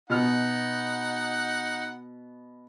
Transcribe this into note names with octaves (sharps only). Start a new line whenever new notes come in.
B2 D#4 F#5 F6